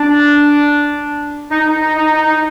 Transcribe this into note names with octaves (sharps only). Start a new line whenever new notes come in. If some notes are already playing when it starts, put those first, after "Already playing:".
Already playing: D4
D#4
D#4
D#4
D#4
D#4
D#4